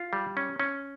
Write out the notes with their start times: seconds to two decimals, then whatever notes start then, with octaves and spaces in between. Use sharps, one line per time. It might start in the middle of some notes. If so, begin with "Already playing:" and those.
Already playing: F4
0.13 G3
0.37 C#4
0.60 C#4